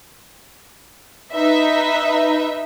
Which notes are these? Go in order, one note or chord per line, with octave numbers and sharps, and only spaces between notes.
D#4 B4 E5